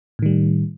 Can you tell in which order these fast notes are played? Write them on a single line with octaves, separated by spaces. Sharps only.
A2 D#3 G3